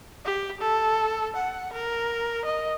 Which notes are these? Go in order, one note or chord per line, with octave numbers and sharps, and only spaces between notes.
G4
A4
F#5
A#4
D#5